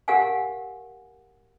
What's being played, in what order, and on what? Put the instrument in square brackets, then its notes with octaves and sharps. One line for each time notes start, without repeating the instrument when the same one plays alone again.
[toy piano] G4 A#4 F5 F#5 G#5